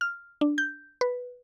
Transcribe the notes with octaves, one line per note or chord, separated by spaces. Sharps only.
F6
D4
G6
B4